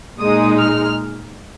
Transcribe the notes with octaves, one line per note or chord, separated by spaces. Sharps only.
A#2 G#3 D#4 D#6
F6